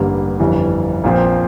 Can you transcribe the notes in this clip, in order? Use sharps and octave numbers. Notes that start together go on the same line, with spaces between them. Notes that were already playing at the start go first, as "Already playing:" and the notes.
Already playing: A1 G2 D3 G3 A#3
G1 F2 E3 G3
A#1 A#2 F3 C4 F4